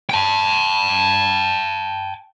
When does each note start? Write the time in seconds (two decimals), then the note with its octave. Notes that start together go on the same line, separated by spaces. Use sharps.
0.10 G5 A5